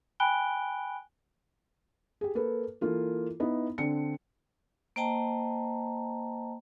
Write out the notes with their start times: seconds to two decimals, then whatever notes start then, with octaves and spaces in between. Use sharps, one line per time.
0.20 G5 G#5 B5 F#6 D7 G7
2.21 G4 G#4
2.35 A#3 A4 B4
2.81 E3 A#3 F4 A4
3.40 B3 D#4 E4
3.78 D3 C4 D4 C#7
4.96 A#3 C5 D#5 G5 A5 A#5